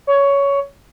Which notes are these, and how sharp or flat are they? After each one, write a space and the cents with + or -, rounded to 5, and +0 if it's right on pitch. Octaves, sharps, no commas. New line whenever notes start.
C#5 +15